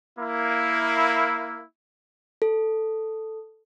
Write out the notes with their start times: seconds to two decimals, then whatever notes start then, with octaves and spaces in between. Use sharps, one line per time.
0.19 A#3 E4
2.42 A4